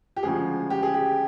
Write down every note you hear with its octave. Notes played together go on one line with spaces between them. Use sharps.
G4
D2 C#3 F3 G#3 G#4
G4
G#4
G4